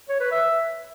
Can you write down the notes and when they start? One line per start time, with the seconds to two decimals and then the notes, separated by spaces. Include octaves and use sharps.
0.09 C#5
0.20 B4
0.32 E5